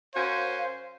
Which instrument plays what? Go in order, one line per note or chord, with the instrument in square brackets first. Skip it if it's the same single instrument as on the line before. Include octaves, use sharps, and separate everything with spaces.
[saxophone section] F#2 C#4 F#4 [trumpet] C5 [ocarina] F5